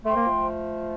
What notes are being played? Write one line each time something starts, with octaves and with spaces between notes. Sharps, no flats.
A3 C5 G5 C6
A#3
F3 A3